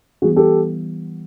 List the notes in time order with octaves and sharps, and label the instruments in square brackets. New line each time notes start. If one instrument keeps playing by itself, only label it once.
[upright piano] E3 G3 B3 F#4 G#4
G4 A4